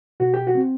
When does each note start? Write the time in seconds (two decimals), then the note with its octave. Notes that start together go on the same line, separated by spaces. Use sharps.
0.20 B2 F#4
0.34 G4
0.47 F#4
0.55 C4